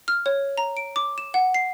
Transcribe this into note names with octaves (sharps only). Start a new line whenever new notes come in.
F6
C#5
A#5
D7
D6
E7
F#5
C7